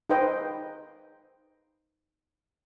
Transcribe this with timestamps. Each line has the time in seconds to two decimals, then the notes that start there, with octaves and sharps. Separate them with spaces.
0.09 D#4 G#4 B4 C5 D#5 G5